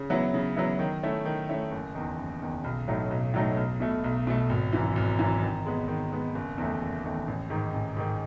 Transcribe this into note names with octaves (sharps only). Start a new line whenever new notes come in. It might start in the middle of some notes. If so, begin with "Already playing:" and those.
Already playing: C#3
F#3 B3 E4
C#3
F#3 B3 E4
D#3
A3 C#4 E4
D#3
A3 C#4 E4
F#1
E2 D#3
F#1
E2 D#3
B1
A2 F#3 A3 D#4
B1
A2 F#3 A3 D#4
B1
B2 A3
B1
B2 A3
G#1
F#2 E3
G#1
F#2 E3
D#3
G#3 B3
D#3
G#3 B3
F#1
E2 D#3 A3
F#1
E2 D#3 A3
A1
G#2 D#3
A1
G#2 D#3